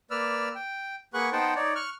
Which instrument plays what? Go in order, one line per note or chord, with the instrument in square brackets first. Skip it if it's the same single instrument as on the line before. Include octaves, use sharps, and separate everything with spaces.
[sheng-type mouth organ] A#3 B4 D5 E6 F6
G5
A#3 G#4 B4 F#5 C#6 F#6
B3 D#4 C5 F#5 G5 A5
D#4 C#5 D5
C#6 F6 F#6